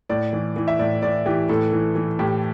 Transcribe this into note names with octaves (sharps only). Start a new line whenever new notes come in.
A2 D5
E3
E3
E5
A2 D5
A2 D5
E3 G4
A2 A4
E3
E3
A2 G4